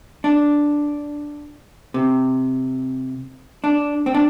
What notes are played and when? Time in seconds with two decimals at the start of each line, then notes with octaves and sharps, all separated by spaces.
0.24 D4
1.94 C3
3.64 D4
4.06 C4
4.14 D4